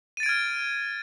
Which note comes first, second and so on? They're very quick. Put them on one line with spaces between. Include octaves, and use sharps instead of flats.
D#7 A6 D7 G#6 F6